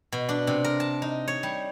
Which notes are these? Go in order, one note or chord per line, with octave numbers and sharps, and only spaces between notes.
B2
D4
C3
A#4
A5
D#4
C#5
G3